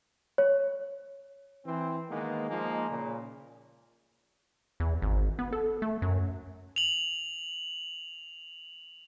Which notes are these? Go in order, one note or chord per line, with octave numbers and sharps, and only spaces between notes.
C#5
E3 C4
D#3 G#3 A#3 B3
F3 G#3 A#3 D#4
A#2 C#3
E2
G#1
B3
A4
A3
F#2
F7 F#7